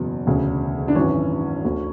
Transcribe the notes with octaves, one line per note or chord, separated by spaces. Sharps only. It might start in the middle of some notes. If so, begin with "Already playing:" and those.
Already playing: F#1 E2 B2
E1 D2 C#3
D4
G#1 F#2 E3 C#4
D2 D3